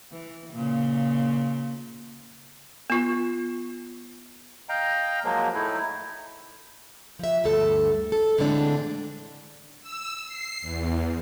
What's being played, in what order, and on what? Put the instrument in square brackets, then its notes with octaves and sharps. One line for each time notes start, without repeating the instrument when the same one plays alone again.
[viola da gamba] E3
A#2 C#3
[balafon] B3 F4
[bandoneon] D#5 F5 G5 A#5
F3 F#3 G#3 A#3
A2 A3 D#4 E4
[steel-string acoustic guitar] F3 E5
D2 G2 A4
A4
A2 D3 E3 G#3 C4 D4
[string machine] E6
C7
E2